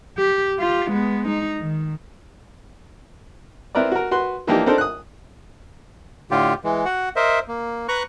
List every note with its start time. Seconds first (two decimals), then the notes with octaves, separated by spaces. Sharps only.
0.18 G4
0.59 F4 G4
0.91 G#3 B3
1.27 D#4
1.59 D#3
3.75 C4 E4 A#4 B4 D5
3.92 F#4 A#4
4.11 F#4 B4 C6
4.47 E3 F3 A#3 D4 D#4 G4
4.66 C4 D4 D#4 A4 A#4 C5
4.78 D#6 F#6
6.31 A2 D3 F4 G4
6.64 E3 G#3
6.85 F#4 F#5
7.16 A#4 C5 D#5 E5
7.48 A#3
7.88 B4 A#5 C#6 F#6